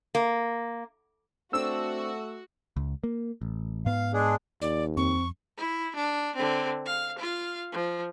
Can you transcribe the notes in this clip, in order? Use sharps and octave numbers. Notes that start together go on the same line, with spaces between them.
A#3
A3 C4 D4 F#4 A4 E6
C#2
A#3
A1
G#2 B3 F5
G#3 D4 G#4
D#2 D5
F2 C4 C#6
E4
D4
D3 C4
F5
F4 F5
F3